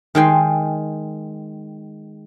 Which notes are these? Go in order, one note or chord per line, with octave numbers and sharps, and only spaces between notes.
D#3 G#3 G5 C6